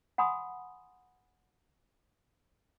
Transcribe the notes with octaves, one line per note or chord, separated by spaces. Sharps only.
F#5 G#5 B5 C6 D#6